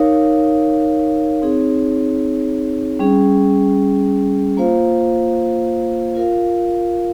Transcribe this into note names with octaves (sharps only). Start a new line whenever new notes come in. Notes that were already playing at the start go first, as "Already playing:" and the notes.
Already playing: D#4 A#4 C#5 F5
C4 D#4 G#4 C#5
G3 C#4 G#4
A#3 F4 C5 F5
F4 A#4 F5